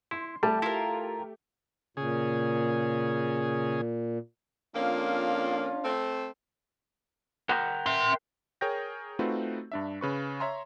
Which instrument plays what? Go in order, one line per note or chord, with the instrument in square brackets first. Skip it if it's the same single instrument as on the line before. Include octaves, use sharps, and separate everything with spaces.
[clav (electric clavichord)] E4 [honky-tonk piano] C6
[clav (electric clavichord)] G3 [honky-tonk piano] A3 G4 [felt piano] A5
[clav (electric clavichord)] E4 [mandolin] F4 A#4
[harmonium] A#2 [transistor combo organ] C#3 G#4
[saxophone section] F2 A#3 [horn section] C#4 D4 F4
[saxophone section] A3 C4
[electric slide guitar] A#4 F#5 G5
[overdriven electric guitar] E5 C6
[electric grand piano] G#4 A#4 C#5 G5 G6 A#6
A3 C4 D#4 F4 F#4 B4
G2 D4 E5
C#3 B4 C#6
C#5 E5 A#5 C6